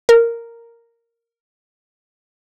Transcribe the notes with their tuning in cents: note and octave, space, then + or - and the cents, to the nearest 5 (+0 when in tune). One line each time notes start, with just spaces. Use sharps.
A#4 -5